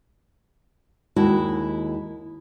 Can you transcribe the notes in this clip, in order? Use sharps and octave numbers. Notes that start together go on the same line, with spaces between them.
D#2 G#3 E4 F#4 A5